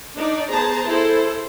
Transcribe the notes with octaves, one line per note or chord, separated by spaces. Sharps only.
D4 D#4 D5
B3 G#4 C5 A5 A#5
E4 G#4 A4 C5